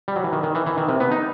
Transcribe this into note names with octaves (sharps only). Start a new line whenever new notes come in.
G3
F#3
E3
D#3
D#3
E3
E3
D#3
C3
B3
D#4